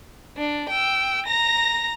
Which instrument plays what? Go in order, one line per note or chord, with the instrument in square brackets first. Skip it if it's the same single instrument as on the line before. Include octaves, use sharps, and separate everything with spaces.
[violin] D4
G5 E6
A#5 A#6